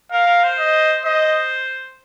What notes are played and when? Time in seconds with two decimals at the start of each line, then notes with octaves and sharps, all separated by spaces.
0.11 A#4 F5
0.26 A#4
0.43 C5
0.59 D#5
1.05 C5 D#5